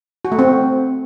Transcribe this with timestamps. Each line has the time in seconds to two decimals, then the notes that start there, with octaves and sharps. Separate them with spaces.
0.25 F#4
0.32 A3
0.39 C4